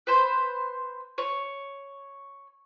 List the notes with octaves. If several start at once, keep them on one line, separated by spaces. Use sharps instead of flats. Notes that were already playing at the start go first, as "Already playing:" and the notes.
B4 C5
C#5